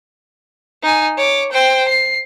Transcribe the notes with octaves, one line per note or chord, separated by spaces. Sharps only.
D#4 G#5
C#5 D6
C5 G5
C7